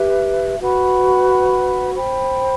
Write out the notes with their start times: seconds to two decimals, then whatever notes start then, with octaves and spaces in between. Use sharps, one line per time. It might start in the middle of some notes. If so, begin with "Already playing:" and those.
Already playing: G4 B4 E5
0.60 F#4 B4 F#5 B5
1.94 C5 G5 B5